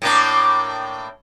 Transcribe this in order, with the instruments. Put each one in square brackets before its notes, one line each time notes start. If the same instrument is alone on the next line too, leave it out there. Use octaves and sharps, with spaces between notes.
[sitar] A2 A#3 D4